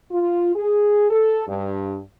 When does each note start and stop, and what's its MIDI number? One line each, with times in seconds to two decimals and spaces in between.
0.12 0.54 65
0.56 1.06 68
1.10 1.44 69
1.48 1.99 43